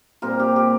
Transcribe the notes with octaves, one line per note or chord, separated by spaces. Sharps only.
A#2 G3 C4 A#4
G4
G4